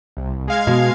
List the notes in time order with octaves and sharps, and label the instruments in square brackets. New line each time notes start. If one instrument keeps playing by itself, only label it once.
[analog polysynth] C2
G#3 F5 G#6
[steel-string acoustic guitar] B2